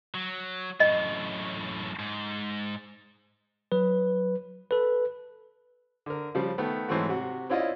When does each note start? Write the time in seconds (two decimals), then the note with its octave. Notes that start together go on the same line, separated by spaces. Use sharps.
0.15 F#3
0.80 F#2 A2 D#5
1.99 G#2
3.72 F#3 B4
4.71 A4 B4
6.06 D3 A#4
6.35 C#3 F3 G3
6.58 D#3 A3 B3
6.89 G#2 E3 F#3 A3 C4 F#4
7.09 C3 F#4
7.49 C4 C#4 E4 F4 D5 D#5